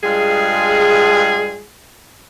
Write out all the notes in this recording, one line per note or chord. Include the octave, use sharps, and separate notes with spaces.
G2 G#3 F4 G#4